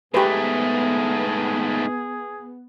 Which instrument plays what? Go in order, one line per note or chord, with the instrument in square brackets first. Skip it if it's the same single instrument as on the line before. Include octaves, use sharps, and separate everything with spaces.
[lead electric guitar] G#2 A3 [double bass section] B3 [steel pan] G4 B4 [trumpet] G#4